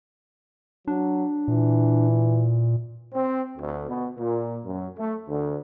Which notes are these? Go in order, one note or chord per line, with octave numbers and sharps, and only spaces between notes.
F#3 D4
A#2 E3
C4
D2
B2
A#2
F#2
A3
D2